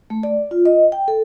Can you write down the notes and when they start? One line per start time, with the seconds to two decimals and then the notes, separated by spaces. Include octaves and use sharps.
0.10 A3
0.23 D5
0.51 F4
0.65 D#5
0.92 G5
1.08 A4